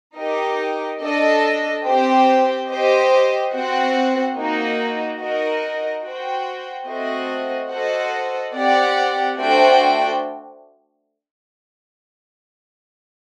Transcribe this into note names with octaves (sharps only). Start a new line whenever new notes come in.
D#4 G4 A#4 D#5
D4 A4 D#5
C4 G4 C5 G5
G4 C5 D#5
C4 F#4 C5 F#5
A#3 D#4 F#4
D#4 F#4 A#4 D#5
F#4 C5 G5
A3 C4 F#4 C5 D#5
F#4 A4 C5 D#5 F#5
C4 G4 D5 F#5
A3 D4 F#4 C5 G5